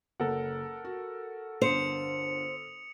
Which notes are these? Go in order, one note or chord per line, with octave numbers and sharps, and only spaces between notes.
F#1 A4 A#4 F#5
F#4
G1 D3 C5 D#6 C#7 F7